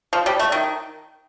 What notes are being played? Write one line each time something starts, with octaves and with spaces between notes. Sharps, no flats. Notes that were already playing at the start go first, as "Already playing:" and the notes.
F3
G3
A3
D#3